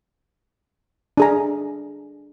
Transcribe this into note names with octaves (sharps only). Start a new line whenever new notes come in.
D4 G#4 A#5